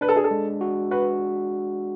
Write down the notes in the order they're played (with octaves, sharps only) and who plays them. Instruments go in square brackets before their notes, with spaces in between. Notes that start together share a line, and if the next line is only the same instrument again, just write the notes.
[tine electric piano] D4 [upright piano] B4
[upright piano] A4
G#4
A4
[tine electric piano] G#3
F#4
[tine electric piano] F#4 [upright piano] B4